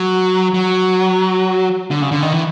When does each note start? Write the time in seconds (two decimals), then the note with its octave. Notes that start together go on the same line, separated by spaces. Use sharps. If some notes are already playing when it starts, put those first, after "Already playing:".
Already playing: F#3
0.54 F#3
1.91 D3
2.02 C#3
2.12 D3
2.22 D#3
2.33 E3